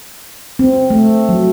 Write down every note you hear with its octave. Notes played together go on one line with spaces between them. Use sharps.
C4
A3
F#3